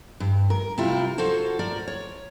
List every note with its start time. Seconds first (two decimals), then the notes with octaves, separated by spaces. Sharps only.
0.20 G2
0.50 A#4
0.78 C3 G3 E4 F4
1.18 F4 F#4 A4 C5 C#5
1.59 A#4 D5
1.88 C#5